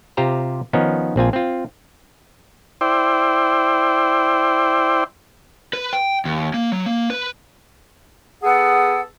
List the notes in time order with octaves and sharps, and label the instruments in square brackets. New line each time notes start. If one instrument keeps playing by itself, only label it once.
[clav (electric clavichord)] C3 F4 G4 C5 A#5
D#3 F3 B3 C#4 D#4
A#1 C4 F4 G#5
C4 F4
[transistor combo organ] E4 C5 D5 G5
[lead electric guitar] B4
G5
D#2
A#3
F#3
A#3
B4
[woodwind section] B3 G#4 A4 F#5